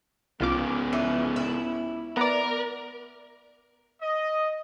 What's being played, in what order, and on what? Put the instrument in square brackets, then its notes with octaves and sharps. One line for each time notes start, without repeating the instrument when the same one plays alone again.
[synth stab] C2 F4 D6 [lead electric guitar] G#2 C#3 [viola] B3 C#4
[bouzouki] E3 D4
E4
[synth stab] B3 D5 [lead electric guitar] A#4 [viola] A#5
[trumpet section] D#5